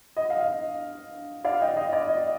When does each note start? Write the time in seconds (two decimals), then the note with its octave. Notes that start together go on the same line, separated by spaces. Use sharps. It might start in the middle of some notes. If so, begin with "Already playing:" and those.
0.16 D#5
0.30 F5
0.43 D#5
1.44 D5 F5
1.61 D#5 G5
1.77 D#5
1.93 D5
2.09 D#5